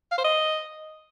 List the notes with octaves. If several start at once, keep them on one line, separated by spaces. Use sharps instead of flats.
F5
C5
D#5